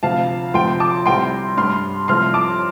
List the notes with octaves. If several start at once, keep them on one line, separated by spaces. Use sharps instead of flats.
D2 C3 F3 F5 A5
D2 C3 F3 G5 C6
A5 D6
C2 C3 G3 G5 C6
G2 G3 C6 F6
C2 C3 F3 C6 F6
A5 D6